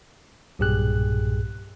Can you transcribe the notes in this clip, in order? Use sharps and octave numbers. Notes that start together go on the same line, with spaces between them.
B1 G2 A#2 G4 G#4 F#6